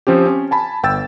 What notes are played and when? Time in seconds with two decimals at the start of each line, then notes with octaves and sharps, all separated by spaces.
0.07 F3 C4 C#4 G4
0.26 C#4
0.51 G#5 A5 B5
0.83 G1 G5 E6 A6